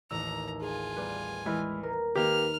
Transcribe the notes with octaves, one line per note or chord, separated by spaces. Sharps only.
A1 D#2 A#5 E6
F4 G#4 G#5
G3 B3 B4
E3 G#3 D#5 B5 F6
A#4 B4
D#3 A#3 D#4 G4 A#4 B4 F6